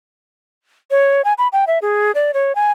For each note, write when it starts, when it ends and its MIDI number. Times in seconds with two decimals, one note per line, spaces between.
0.91 1.22 73
1.25 1.33 80
1.38 1.48 83
1.53 1.65 79
1.67 1.79 76
1.82 2.12 68
2.15 2.31 74
2.34 2.55 73
2.55 2.72 80